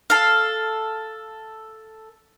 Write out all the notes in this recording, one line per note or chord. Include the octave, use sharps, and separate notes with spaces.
A4 F5